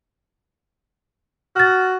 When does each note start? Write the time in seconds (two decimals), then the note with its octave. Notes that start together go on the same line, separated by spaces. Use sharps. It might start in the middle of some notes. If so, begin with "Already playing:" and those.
1.56 F#4 F6 A6